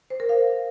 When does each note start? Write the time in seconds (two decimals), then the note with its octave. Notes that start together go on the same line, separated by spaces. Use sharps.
0.10 C5
0.20 A#4
0.29 F5